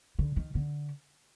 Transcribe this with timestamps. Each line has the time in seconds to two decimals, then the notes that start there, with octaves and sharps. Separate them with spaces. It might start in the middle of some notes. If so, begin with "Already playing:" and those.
0.19 D3
0.36 D#3
0.55 D3